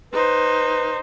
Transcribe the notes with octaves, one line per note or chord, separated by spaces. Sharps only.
D#4 B4 C5